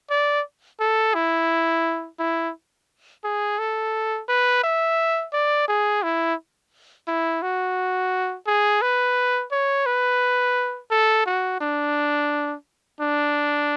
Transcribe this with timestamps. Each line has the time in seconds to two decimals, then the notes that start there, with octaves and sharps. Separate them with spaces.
0.10 D5
0.80 A4
1.14 E4
2.19 E4
3.24 G#4
3.59 A4
4.28 B4
4.63 E5
5.33 D5
5.68 G#4
6.03 E4
7.07 E4
7.42 F#4
8.47 G#4
8.82 B4
9.52 C#5
9.86 B4
10.91 A4
11.26 F#4
11.61 D4
13.00 D4